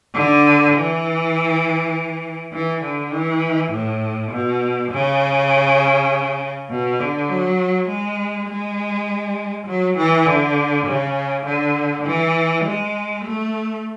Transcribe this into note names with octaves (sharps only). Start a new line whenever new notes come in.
D3
E3
E3
D3
E3
A2
B2
C#3
B2
D3
F#3
G#3
G#3
F#3
E3
D3
C#3
D3
E3
G#3
A3